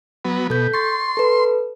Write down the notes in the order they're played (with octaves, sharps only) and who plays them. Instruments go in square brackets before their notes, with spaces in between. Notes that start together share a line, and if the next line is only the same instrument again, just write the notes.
[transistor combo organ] F#3 B3
[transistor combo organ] B2 [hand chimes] A4 G6 B6
[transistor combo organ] C6 [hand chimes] C#6 A6
[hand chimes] A4 B4